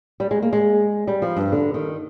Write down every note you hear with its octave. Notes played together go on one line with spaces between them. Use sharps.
G3
G#3
A#3
G#3
G3
F3
G2
D3
D#3